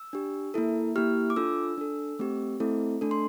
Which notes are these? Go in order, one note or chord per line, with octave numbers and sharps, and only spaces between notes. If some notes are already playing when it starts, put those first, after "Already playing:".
Already playing: E6
D4 G4
A#3 E4 A4
A#3 E4 G4 F6
D6
D4 F4 A4 E6
D4 A4
A3 C4 G4
A3 C4 E4 A4
A3 D4 A4
C6